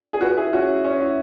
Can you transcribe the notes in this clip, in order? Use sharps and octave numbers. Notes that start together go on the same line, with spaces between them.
G#4
F#4 B4
E4 G#4
C#4 F#4
E4
C#4
E4